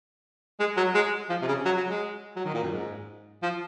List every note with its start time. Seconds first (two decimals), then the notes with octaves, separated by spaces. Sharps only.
0.60 G#3
0.77 F#3
0.95 G#3
1.30 F3
1.42 C3
1.48 C#3
1.65 F#3
1.77 F#3
1.89 G#3
2.36 F#3
2.45 D#3
2.54 A#2
2.63 F#2
2.72 G#2
3.43 F3